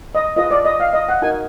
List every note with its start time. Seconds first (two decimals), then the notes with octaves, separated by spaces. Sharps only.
0.15 D#5
0.36 F4 G#4 B4 D#5
0.51 D5
0.65 D#5
0.80 F5
0.93 D#5
1.09 F#5
1.22 D#4 F#4 A#4 G#5